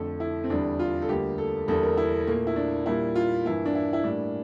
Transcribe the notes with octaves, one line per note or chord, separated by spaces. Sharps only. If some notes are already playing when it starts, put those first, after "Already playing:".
Already playing: F2 D3 A3 A4
E4
C4
E2 D3 G3 D4
F4
A4
D2 D3 G3 A#3 G4
A4
E2 D3 G3 A#3 A4
A#4
E4
A#2 A3 A#3
E4
D4
A#2 G3 A#3 E4
F4
G2 E3 A#3 E4
D4
E4
E4
A2 G3 A#3 D4